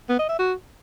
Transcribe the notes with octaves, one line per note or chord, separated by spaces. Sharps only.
B3
D#5
E5
F#4